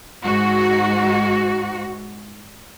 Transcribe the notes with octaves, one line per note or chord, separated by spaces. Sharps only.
G#2 F#4